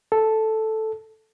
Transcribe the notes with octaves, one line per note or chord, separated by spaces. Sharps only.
A4